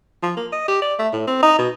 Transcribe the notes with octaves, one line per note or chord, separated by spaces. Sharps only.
F3
A#3
D#5
G4
D5
A3
A2
C4
D#4
B2